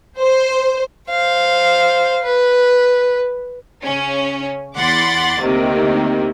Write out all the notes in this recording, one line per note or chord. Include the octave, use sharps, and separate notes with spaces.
C5
C5 F5
B4
C#3 C#4
E2 F#5 B5 C6 D6 A6
D2 C3 D#3 A#3